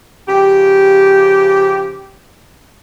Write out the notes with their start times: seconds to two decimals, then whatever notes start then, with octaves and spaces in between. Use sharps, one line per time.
0.28 C#3 F3 G4